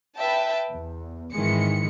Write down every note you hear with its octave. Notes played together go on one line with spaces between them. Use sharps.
B4 E5 G5 A5
E2
G#1 D#3 E3 G#3 C#7